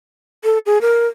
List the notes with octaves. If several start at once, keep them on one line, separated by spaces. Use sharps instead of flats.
A4
G#4
A#4